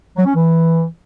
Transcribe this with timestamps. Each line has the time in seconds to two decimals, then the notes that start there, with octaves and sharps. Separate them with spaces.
0.15 F#3
0.25 C#4
0.34 E3